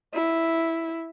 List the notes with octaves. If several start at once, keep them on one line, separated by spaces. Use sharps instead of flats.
E4